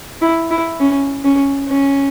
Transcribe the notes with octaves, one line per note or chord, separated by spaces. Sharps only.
E4
E4
C#4
C#4
C#4